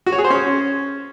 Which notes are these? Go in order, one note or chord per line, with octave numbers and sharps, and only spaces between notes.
F#4
C#5
G#4
C5
C#4